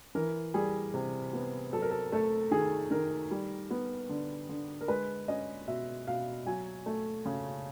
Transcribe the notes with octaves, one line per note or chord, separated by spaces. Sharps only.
E3 A#4
G3 G#4
C3
B3
F#3 A4
A#4
A4
A3 A4
D#3 G#4
D#3 A#4
G3
B3
D3
D3
A#4
G#3 B4
C#4 D#5
B2 E5
B2 F5
F#3 G#5
A3
C#3